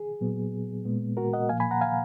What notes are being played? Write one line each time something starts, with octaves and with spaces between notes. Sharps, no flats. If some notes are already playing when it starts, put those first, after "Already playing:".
Already playing: G#4
A#2 F#3 B3
A#2 G#3 B3
F#4 A#4
D#5 F#5
A#2 F3 A#3 F5 G#5
G#5 B5
F#5 A#5
F5 G#5